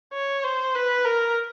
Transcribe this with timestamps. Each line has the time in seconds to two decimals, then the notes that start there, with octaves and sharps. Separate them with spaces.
0.13 C#5
0.44 C5
0.75 B4
1.05 A#4